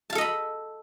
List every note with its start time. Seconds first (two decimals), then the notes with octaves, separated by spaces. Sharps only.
0.10 A5
0.13 F5
0.15 A4
0.18 D#5
0.21 B5